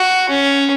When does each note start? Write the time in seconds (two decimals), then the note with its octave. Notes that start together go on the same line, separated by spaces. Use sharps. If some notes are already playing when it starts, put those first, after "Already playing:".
Already playing: F#4
0.29 C#4